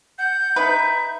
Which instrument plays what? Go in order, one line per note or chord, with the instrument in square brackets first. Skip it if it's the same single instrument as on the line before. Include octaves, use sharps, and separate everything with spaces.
[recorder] F#5 [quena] G6
[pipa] D#4 B4 [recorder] E5